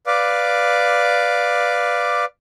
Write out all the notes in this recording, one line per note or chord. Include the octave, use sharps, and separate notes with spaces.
B4 D5 F5 D6